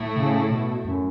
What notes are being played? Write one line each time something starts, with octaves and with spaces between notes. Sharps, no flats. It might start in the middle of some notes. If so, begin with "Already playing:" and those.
Already playing: A2 A3 E4
C#3
B2
F#2